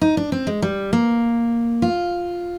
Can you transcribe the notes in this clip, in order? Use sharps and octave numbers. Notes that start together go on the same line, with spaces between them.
D#4
D4
C4
G#3
G3
A#3
F4